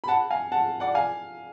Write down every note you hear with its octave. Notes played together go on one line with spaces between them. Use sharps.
B5
F#5 A5
F5 G#5
F#5 A5
D5 F#5
F5 G#5